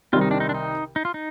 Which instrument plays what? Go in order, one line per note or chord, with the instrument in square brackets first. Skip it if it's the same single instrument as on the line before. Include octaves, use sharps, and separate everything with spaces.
[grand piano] C2 C3 D#3 G3 C4 [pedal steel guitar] F4
[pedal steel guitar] D#4
D4
D#4
D4
D#4
D#4
F4
D#4